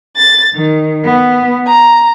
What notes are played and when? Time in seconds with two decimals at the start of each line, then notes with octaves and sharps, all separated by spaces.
0.16 A6
0.54 D#3
1.05 B3
1.66 A#5